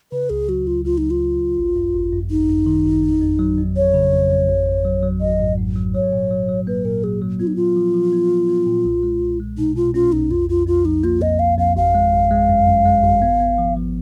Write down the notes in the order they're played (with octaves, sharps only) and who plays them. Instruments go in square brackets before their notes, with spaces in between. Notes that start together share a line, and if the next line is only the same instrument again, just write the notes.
[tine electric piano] C#3 [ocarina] B4
[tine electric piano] C#2 [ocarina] G#4
[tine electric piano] F#3 [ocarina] F#4
[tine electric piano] C#2 [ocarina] F4
[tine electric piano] C#2 [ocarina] F4
[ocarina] D#4
[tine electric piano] F#3
[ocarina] F4
[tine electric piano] C#2
C#2
G#1
F#2
G#1
F#2
[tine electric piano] G#1 [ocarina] D#4
[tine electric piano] F#2
D#3
G#1
F2
F2
F#3
F2
[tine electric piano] F2 [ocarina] C#5
[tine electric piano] C#3
F2
F2
G#1
G#1
F#3
F#3
[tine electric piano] G#1 [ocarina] D#5
[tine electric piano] G#2
G#2
F#3
[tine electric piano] F#3 [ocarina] C#5
[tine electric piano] A#2
F#3
F#3
[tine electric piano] A#3 [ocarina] B4
[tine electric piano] A#2 [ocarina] A#4
[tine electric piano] F#3 [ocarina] G#4
[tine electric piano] F#3
[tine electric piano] B3 [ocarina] F4
[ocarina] D#4
[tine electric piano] A#2 [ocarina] F4
[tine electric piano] F3
F3
B3
F3
B3
A#2
B1
G#3
B1
G#3
[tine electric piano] B2 [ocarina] D#4
[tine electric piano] B2 [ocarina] F4
[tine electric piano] C#4 [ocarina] F4
[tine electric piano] B1 [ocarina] D#4
[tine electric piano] F2 [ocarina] F4
[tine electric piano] F2 [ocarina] F4
[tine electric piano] F2 [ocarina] F4
[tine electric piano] F3 [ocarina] D#4
[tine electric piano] A#3 [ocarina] F4
[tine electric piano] F2 [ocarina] D#5
[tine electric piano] F2 [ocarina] F5
[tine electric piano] F2 [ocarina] F5
[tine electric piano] G#1 [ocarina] F5
[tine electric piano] G#3
G#1
G#3
F#2
F#2
G#3
G#1
B3
B3
F3
F3